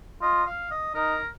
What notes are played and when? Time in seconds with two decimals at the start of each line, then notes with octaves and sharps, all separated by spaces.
0.22 F4 D#5
0.46 F5
0.71 D#5
0.95 D#4 A#4